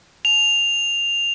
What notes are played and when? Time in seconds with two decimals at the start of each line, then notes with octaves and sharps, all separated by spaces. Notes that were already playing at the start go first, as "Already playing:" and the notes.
0.25 F7